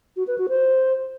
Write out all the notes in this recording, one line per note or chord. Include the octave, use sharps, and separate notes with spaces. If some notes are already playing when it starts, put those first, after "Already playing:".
F#4
B4
F#4
C5